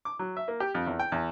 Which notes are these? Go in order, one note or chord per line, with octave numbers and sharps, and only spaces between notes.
D6
F#3
E5
A#3
G4
F2
E2
G5
E2